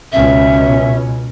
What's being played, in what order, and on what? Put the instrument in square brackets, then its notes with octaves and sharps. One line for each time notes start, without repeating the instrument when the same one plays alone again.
[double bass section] C#2 B2 C#4 [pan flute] E5